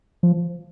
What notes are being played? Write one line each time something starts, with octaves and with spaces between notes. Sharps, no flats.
F3